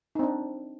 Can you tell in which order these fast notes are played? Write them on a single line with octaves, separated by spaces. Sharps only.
D#4 C4 D4